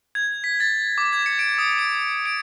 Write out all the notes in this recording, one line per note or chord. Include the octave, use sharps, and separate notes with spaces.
G#6
B6
A6
D6
G#6
C#7
D7
D#6
D7
D7